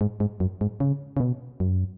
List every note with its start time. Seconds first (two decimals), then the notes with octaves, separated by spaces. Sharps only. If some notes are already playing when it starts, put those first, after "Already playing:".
0.01 G#2
0.20 G#2
0.40 F#2
0.61 G#2
0.80 C#3
1.17 C#3
1.20 B2
1.60 F#2